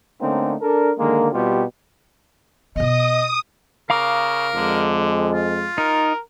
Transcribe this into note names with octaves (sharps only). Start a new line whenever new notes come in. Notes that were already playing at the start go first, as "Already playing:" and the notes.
D3 A3 A#3 C4 C#4 D#4
D4 A4 A#4
D3 D#3 G#3 A#3
B2 G3 C4 F4 G4
B2 B3 D#5 D#6
C#3 A#4 F5 A#5 D6
F2 D3 G#3
F4
D#4 A#4